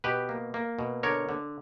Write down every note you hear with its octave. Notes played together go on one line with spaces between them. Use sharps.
B2 G4 B4
A#3
A#3
B2
D3 A#4 C#5
D3